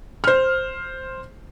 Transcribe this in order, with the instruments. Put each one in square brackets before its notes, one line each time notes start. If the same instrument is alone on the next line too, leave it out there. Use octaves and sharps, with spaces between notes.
[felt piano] C5 F6